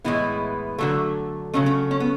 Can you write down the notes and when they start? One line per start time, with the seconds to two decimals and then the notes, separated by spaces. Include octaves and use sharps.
0.04 A2 E3 G#3 B3 E4
0.78 D3 F#3 A3
1.54 C#3 F#3 A3 C#4
1.66 C#4
1.91 C#4
2.00 B3